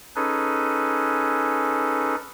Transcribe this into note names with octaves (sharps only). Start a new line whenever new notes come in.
C#4 D#4 G#4 A4 B4